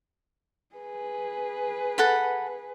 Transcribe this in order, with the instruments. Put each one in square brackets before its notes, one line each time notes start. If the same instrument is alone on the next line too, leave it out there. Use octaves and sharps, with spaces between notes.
[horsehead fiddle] G#4 B4
[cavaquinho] A4 F#5 B5